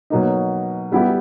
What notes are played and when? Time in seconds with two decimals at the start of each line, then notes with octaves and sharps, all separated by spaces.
0.10 B2 F#3 A#3 D#4
0.92 G3 B3 E4 G4